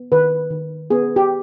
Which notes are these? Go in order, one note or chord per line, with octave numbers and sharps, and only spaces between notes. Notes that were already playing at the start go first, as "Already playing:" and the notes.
Already playing: B3
D#3 B4
D#3
B3 G#4
G4